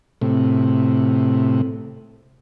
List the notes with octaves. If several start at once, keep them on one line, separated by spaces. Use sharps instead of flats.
A2 C3